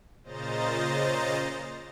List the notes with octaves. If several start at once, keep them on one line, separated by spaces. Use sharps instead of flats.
A#2 C#3 C5 D#5 A#5 A6